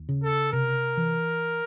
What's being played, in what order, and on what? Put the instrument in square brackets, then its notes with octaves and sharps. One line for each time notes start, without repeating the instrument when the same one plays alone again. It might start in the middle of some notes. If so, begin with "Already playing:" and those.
Already playing: [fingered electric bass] D#2
C#3
[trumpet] A4
[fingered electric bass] C3 [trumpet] A#4
[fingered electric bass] E3